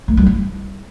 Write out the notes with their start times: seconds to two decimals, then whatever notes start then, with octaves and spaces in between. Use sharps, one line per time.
0.08 A3
0.17 G3
0.27 E4